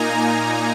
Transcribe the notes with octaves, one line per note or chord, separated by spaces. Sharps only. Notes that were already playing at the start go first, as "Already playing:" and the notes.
Already playing: A#2 A#3 D#4 G#5 A#5
G#5